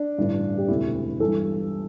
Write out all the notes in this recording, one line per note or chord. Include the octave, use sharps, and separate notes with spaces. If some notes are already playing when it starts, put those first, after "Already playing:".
Already playing: D4
A1 G2 D3
G4
E1 D2 C3 E4
G1 G2 E3 A4